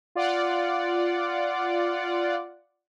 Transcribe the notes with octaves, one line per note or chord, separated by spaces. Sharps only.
F4 D5 F#5